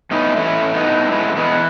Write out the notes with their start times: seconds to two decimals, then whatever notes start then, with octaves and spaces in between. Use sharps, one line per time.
0.11 A2 B3 D#4
0.36 E3 A3 C#4
0.62 A2
0.74 B3 D#4
0.87 A2
1.11 E3 G#3
1.36 E3 G#3 B3